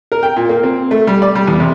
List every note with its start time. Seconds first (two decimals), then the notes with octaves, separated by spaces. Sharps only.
0.12 A#4
0.23 G5
0.36 A#2
0.49 A#3
0.63 C4
0.91 A3
1.07 G3
1.22 D5
1.35 G3
1.47 E2
1.60 C3